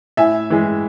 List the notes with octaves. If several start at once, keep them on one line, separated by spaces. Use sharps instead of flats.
A2 E5 G#5
E3 G#3